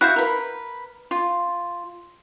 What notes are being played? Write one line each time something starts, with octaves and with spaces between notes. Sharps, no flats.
E4 F#4 F5 F#6 G6
A#4 B4
F4